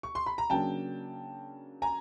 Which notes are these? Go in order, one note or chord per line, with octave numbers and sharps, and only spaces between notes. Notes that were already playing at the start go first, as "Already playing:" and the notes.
C#6
C6
B5
A#5
C#3 F#3 A#3 D4 G5 A5
G#5 A#5